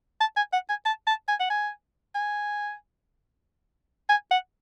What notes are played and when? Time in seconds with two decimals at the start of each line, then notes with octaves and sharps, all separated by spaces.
0.20 A5
0.37 G#5
0.53 F#5
0.69 G#5
0.85 A5
1.07 A5
1.28 G#5
1.40 F#5
1.50 G#5
2.15 G#5
4.09 G#5
4.31 F#5